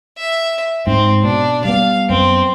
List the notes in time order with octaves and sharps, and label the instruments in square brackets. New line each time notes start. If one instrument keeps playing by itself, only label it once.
[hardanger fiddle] E5
[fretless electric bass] G#2 [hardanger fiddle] C4
[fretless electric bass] B2 [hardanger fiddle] D4
[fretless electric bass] G3 B3 [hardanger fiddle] F5
[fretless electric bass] F#2 B3 [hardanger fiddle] C4